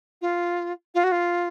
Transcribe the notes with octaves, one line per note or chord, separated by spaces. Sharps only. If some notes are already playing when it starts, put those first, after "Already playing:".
F4
F4
F#4
F4